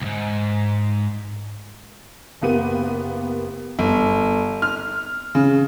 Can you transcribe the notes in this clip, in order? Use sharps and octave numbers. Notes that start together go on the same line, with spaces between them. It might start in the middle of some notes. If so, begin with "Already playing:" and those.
C2 G#2
F#1 A#3 B3 G4 D#7
G1
F6
C#3